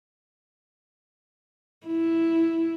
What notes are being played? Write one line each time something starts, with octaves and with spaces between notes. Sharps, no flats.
E4